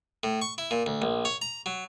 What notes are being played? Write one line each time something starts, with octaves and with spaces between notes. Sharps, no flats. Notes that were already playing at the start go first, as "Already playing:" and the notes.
A2
C#6
E4
A#2
D2
A#1
C#5
A#5
F#3